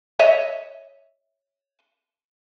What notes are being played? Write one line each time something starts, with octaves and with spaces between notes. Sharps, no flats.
C#5 D#5 E5